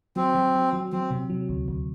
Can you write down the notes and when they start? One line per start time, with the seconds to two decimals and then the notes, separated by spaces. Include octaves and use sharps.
0.16 F#3 C4
0.35 F#3
0.55 F#3
0.73 F#3
0.93 F#3 C4
1.11 C3
1.30 F#3
1.49 D2
1.68 D2